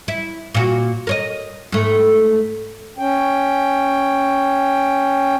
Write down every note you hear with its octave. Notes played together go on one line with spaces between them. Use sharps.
E4
A#2 F#4
A#4 C#5 D#5
G#2 A3
C#4 G5